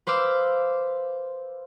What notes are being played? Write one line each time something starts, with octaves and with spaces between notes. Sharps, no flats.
B4 C5 F5 D6 E6